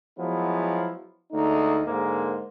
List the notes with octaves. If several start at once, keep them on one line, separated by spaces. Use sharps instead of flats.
F3 F#3 G#3 B3 E4
D2 G#3 A3 D#4
G#2 D3 G#3 A#3 C5